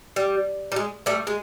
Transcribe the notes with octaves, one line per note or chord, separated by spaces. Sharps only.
G3
G3
G#3
G3 A3
G#3